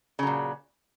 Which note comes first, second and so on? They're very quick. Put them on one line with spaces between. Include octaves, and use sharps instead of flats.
C#3 F#3 A#2